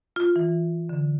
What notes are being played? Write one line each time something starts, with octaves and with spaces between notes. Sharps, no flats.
F4
E3
D3